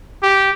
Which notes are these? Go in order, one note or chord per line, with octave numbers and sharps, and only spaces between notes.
G4